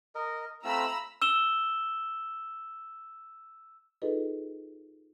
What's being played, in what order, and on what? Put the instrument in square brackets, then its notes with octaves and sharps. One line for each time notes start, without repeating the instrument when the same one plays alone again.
[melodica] A#4 D#5
[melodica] A3 C4 F4 [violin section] A#5 B5 E6
[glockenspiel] E6 E7 G7
[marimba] D#4 F4 G#4 A4 B4 D#5